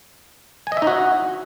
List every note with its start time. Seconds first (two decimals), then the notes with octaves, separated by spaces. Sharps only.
0.67 G#5
0.72 D#5
0.77 E5
0.82 D#4
0.87 F#4